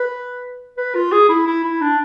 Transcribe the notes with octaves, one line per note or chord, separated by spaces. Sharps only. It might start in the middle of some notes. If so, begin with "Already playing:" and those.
Already playing: B4
B4
F4
G#4
E4
E4
E4
D4